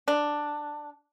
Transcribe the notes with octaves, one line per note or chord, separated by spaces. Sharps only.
D4